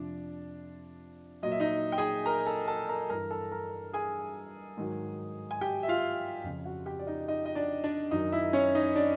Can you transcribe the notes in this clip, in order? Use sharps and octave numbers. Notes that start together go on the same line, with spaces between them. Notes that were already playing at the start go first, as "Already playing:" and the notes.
Already playing: F2 C3 F3 D4 D5
A#2 F#3 D#5
E5
D#4 D#5
G5
G#4 G#5
A#4 A#5
A4 A5
A4 A5
A#4 A#5
G2 E3 A#4 A#5
A4 A5
A#4 A#5
G#4 G#5
G#2 D#3 F#3
G#5
G4 G5
E5
F4 F5
F2 C#3 F3
F#4 F#5
G4 G5
D5
D#4 D#5
D#4 D#5
D#5
D4 D5
D4 D5
F#2 D#3 F#3 D#4 D#5
E4 E5
C#4 C#5
D#4 D#5
D4 D5